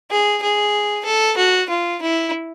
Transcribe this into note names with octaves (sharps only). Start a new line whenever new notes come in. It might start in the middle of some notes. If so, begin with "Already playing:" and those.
G#4
G#4
A4
F#4
F4
E4